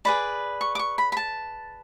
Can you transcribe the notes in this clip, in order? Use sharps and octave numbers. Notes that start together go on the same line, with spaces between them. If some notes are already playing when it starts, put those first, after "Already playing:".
G#4 B4 D5 B5
C#6
D6
C#6
B5
B5
A5